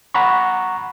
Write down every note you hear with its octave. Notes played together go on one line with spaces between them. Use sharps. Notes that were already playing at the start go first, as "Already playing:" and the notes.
F#5 A#5 B5 C#6